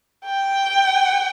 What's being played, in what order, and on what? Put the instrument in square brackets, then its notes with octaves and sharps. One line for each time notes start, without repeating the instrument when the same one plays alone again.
[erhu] G5